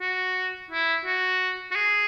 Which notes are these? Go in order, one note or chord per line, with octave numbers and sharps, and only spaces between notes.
F#4
E4
F#4
F#4
G#4